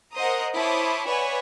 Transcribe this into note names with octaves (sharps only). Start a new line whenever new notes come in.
A#4 C5 D#5 F#5 A#5 D#6
E4 C5 C#5 A5 D6 D#6
B4 C#5 D5 E5 F#5 G#5